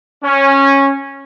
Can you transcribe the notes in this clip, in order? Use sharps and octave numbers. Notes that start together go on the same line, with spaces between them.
C#4